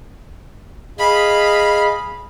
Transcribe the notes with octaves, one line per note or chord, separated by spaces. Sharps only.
G#4 D#5 F5 B5